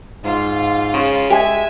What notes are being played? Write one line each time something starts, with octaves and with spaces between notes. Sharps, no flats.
G#2 F4
C#3
G#3 G4 G#4 E5 G#5